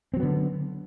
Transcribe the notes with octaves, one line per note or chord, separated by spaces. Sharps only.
D3 F#3 B3 C4